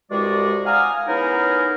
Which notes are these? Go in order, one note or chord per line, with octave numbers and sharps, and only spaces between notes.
C2 G2 G#3 F#4 D5
F5 F#5 G#5 A#5 D#6 F6
B3 C#4 D#4 E4 G#4 A#4